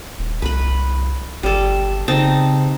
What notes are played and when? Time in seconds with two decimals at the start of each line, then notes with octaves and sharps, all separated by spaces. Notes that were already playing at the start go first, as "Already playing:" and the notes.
0.19 D#1
0.42 C2 B4 B5
1.43 G1 G3 A4
2.08 C#3 C4 D#4 A5